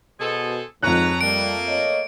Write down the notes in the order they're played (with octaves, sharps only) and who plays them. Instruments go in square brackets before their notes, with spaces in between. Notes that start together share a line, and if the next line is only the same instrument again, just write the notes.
[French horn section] B2 [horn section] G#4 A4 C5
[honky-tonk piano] F2 F#6 [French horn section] G#2 [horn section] B4 C#5 A#5
[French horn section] G3 [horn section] A3 A#3 [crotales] D7
[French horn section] C#5 D#5